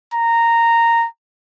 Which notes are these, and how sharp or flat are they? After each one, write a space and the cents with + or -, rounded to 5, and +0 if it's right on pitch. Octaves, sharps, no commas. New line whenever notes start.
A#5 -10